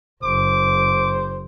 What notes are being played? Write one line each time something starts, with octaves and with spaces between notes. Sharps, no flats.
F#1 C5 D6